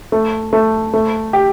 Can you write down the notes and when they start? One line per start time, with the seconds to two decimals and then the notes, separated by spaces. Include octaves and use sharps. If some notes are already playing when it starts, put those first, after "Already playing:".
0.12 A3
0.53 A3
0.94 A3
1.33 G4